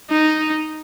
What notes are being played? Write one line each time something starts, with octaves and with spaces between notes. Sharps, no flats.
D#4